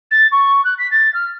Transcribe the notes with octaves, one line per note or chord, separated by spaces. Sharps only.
A6
C#6
F#6
B6
A6
F6